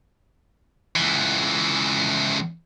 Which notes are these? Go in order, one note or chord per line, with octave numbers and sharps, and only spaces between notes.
C#2 E3